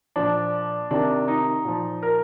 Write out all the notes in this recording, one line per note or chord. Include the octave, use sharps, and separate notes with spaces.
A#2 F3 D4
C3 D#3 D4
D#4
A#2 F3
A#4